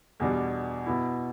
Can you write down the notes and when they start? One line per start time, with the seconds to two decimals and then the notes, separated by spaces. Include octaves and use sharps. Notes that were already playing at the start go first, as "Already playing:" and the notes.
0.20 E2 B2 G3 D4
0.86 B2 B3 E4